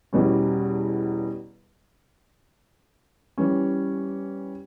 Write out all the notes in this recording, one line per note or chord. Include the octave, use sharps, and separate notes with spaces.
E2 B2 G3 C#4
E3 G3 C#4